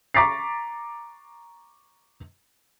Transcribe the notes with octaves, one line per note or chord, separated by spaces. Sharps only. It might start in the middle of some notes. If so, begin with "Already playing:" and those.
A#5 C#6 D6 A6 B6 C7